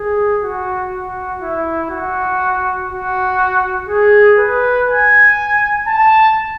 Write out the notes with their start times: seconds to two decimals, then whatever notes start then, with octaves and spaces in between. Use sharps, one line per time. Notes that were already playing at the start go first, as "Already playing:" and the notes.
Already playing: G#4
0.42 F#4
0.91 F#4
1.41 E4
1.90 F#4
2.90 F#4
3.89 G#4
4.39 B4
4.88 G#5
5.87 A5